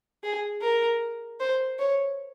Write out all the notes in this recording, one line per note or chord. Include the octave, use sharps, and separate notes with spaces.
G#4
A#4
C5
C#5